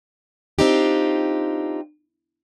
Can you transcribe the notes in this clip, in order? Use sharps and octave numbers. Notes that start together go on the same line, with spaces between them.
C4 D4 D#4 F4 G4